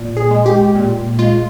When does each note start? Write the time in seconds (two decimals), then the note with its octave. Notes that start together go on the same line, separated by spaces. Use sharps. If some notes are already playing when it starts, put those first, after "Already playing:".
Already playing: A#2
0.17 G#4
0.31 G#3
0.46 G4
0.75 A#2
1.19 G#3 F4